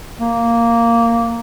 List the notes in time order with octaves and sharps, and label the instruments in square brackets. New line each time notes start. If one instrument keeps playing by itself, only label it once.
[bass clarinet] A#3